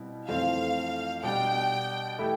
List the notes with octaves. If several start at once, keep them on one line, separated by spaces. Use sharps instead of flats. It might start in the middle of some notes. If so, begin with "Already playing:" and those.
Already playing: B2 G3 C4 E4
F2 E3 A3 C4 F4 F5
B2 G3 D4 G4 G5
E3 A3 E4 G4